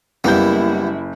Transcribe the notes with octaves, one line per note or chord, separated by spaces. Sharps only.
F#1 G3 A#3 B3 E4 G6